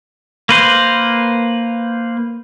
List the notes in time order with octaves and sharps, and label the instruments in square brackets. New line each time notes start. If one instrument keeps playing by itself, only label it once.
[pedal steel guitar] A#3 B4 C5